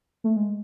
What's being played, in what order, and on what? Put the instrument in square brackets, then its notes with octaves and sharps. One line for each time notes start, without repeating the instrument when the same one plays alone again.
[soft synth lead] A3
G#3